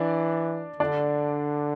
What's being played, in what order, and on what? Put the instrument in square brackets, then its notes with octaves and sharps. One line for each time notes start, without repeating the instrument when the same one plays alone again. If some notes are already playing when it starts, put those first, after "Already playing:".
Already playing: [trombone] E3 [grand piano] D4 D5
[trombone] D3 [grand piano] D4 D5